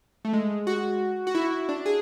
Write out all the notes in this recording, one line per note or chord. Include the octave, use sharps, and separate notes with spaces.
A3
G#3
F#4
F#4
E4
D4
G#4